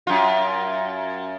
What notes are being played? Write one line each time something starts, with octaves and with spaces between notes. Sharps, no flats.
F#2 F4